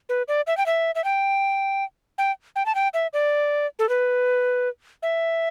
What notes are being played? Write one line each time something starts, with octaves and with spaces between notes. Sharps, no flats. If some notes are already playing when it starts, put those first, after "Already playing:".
B4
D5
E5
G5
E5
E5
G5
G5
G5
A5
G5
E5
D5
A4
B4
E5